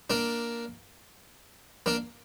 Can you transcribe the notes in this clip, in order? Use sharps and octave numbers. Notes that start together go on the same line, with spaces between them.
A#3 D4
A#3 D4